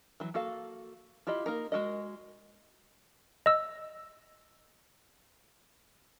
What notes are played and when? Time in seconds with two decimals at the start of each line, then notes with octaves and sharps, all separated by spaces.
0.20 E3 F#3
0.34 A#3 F#4 A4 F5
1.27 E4 F4 G4 D#5 B5
1.46 A#3 D#4 A#4
1.72 G#3 F#4 A#4 D#5
3.46 D#5 E6